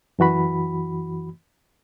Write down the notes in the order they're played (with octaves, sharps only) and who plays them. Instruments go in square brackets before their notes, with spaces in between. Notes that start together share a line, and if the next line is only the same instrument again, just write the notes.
[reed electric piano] F#2 E3 F#4 B5